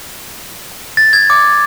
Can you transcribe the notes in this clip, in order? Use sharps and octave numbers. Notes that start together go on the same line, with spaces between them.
A6
G#6
D6